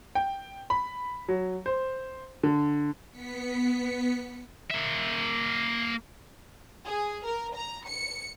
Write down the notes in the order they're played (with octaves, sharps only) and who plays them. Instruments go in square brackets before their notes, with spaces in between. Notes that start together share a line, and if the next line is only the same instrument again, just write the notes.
[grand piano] G5
B5
F#3
C5
D3
[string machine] B3 B6 C#7
[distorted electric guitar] A#3 E5
[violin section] G#4
A#4
A#5
C#7